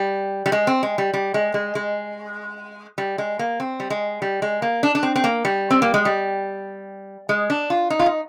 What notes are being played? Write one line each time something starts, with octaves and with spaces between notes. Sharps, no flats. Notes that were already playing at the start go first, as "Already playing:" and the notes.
Already playing: G3
G3
G#3
C4
G#3
G3
G3
G#3
G#3
G#3
G3
G#3
A#3
C4
G3
G#3
G3
G#3
A#3
D4
D4
C4
C4
A#3
G3
C4
A#3
G#3
G3
G#3
D4
F4
D#4
F4
D#4